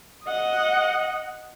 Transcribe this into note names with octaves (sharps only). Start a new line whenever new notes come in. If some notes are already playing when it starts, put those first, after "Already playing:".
D#5 F#5